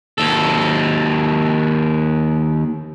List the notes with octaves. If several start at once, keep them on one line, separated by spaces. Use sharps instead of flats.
D#2 A4